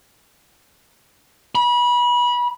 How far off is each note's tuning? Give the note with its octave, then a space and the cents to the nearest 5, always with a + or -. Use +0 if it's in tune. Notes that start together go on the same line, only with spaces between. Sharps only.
B5 -30